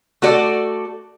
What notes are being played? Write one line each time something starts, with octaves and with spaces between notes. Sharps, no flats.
A3 F#4 A4 D5